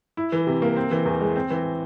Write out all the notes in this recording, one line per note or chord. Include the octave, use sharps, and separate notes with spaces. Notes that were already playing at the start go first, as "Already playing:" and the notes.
E4
E3
C3
A#3
C4
E3
E2
G#3
C4
E3